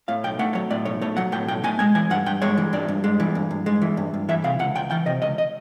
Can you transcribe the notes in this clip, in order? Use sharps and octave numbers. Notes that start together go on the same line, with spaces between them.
A2 F5
B1 G5
A3 F#5
F#3 C#5
A2 D5
B1 C#5
A3 C#5
F#3 F#5
A2 G5
B1 G5
A3 G#5
G#3 G#5
E3 G#5
G2 F#5
G2 G5
G#3 C#5
E3
G2 D5
G2
G#3
E3
G2
G2
G#3
E3
G2
G2
E3 E5
C3 F5
C#2 F#5
C#2 G5
E3 G5
C3 D#5
C#2 D#5
D#5